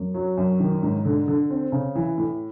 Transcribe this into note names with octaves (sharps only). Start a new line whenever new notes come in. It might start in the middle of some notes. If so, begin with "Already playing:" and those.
Already playing: F#2
F#3
F#2
D#3
G#2
D3
D3
C4
C#3
E3
A2